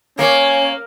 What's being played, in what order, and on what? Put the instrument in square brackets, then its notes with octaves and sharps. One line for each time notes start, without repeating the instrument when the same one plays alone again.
[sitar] A#3 [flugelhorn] C#4 [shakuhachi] C#5